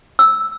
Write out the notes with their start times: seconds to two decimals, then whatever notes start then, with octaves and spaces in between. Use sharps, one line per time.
0.19 E6